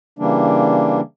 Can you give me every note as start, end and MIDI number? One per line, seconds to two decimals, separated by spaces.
0.19 1.01 49
0.19 1.01 52
0.19 1.01 55
0.19 1.01 58
0.19 1.01 62